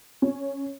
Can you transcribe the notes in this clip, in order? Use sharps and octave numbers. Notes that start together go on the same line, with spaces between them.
C#4